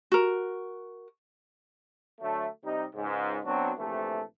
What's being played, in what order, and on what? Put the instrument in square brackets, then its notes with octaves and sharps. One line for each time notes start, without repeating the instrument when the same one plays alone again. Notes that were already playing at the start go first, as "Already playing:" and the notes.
[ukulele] F#4 A#4
[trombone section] D3 F#3 A3
C3 G3 D#4
C#2 G#2
F#3 B3 C4 D4 F#4
A#1 C3 E3 A3